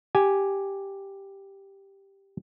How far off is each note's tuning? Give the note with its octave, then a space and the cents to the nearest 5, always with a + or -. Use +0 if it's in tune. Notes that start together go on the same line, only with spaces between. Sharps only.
G4 +0 G#5 +0